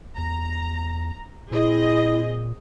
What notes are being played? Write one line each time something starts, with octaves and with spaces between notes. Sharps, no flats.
E2 A#5
A#2 C4 E4 G#4 D#5